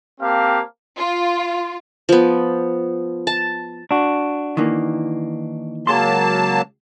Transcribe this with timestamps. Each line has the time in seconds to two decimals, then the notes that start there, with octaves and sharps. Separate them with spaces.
0.20 A#3 C4 G4 F5 A5
0.99 F4
2.09 F3 B3
3.27 A5
3.91 D4 F#4
4.57 D#3 E3 A#3
5.87 C#2 F#3 A#3 G#4 A5 C6